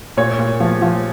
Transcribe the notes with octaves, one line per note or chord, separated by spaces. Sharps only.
A#2 C#5
A#2
F3
F3